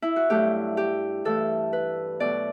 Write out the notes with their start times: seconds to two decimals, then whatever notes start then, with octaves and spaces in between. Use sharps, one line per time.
0.02 E4
0.16 F#4
0.30 G2 F#3 A3 G4
0.77 G4
1.25 G2 E3 A3 A4
1.73 B4
2.20 B2 F#3 A3 D5